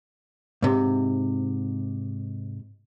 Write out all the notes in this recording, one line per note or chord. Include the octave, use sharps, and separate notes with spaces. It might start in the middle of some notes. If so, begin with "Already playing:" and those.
G#2 C3